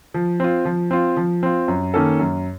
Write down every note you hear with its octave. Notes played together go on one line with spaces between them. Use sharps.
F3
C4 F4
F3
C4 F4
F3
C4 F4
F#2
D#3 A#3 C#4 A4
F#2